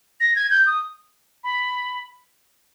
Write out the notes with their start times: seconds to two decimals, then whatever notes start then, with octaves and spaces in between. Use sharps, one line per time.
0.20 A#6
0.36 G#6
0.51 G6
0.66 D#6
1.44 B5